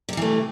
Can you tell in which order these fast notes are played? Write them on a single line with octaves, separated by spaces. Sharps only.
C3 G3 E3 A3